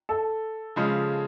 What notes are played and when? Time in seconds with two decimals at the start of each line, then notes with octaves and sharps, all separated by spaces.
0.09 A4
0.76 C#3 F3 G#3